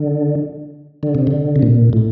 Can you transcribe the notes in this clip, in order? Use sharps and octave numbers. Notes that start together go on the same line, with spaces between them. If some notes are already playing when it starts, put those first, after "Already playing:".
Already playing: D3
D3
C3
D3
C3
A#2
A2